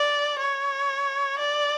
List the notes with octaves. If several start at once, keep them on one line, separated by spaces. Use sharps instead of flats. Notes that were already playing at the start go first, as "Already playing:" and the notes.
Already playing: D5
C#5
D5